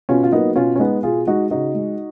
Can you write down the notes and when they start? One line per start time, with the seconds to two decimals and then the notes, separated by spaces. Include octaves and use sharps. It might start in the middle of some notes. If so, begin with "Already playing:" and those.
0.09 B2 C#4 F4
0.23 F4
0.32 F#3 A#3 B3 D#4
0.56 B2 C#4 F4
0.76 C#4
0.79 G#3 B3 D#4
1.03 B2 F4 G#4
1.27 G#3 D#4 F#4
1.50 C#3 D#4 F#4
1.75 G#3